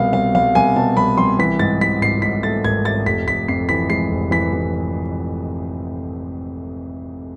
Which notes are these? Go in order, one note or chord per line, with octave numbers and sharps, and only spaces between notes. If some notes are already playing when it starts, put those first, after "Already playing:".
Already playing: C2 B2 F5
C2 F5
C2 F5
C2 G#5
B2 A5
C2 B5
C2 C6
E3 B6
G#2 A6
E3 B6
G#1 C7
G#2 B6
A3 A6
G#1 G#6
A3 A6
F1 B6
F1 B6
F2 C7
E3 B6
G#3 C7
F1
E3 B6
E3